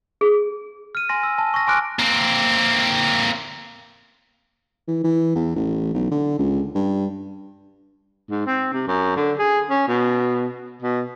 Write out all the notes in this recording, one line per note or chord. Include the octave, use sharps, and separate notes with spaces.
G#4
F6 D#7
G#5 C6 A#6
E6
A5
C#6 A#6
G#5 C6 D6 F6 F#6 D7
A#3 C4
E3
E3
E2
A1
B1
D3
C#2
G2
G#2
C4
C3
F#2
D3
G#4
C#4
B2
B2